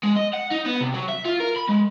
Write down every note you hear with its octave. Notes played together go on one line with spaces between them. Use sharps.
G#3
D#5
F#5
D#4
B3
C3
F#3
E5
F4
A#4
B5
G#3